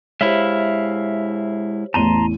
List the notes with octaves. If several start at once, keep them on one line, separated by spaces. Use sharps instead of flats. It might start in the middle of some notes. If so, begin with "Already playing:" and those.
G#3 E4 G4 C5 C#5 E5 F5 B5
A1 E2 A5 A#5 C6 D#7